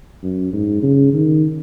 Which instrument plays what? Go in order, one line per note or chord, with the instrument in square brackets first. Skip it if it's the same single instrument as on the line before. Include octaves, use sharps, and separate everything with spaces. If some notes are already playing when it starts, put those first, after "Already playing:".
[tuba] F#2
G#2
C#3
D#3